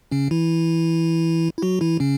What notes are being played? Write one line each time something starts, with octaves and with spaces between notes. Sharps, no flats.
C#3 C#4
E3 E4
E4
F#3 F#4
E3 E4
C#3 C#4